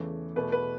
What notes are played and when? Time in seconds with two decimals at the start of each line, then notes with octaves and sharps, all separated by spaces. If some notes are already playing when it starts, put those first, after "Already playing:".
Already playing: E2 C#3 E3 A3
0.36 E2 B2 A3 B4
0.52 B4